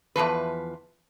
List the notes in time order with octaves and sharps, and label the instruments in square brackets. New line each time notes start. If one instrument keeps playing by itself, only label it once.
[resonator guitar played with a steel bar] E2 A#2 F3 B4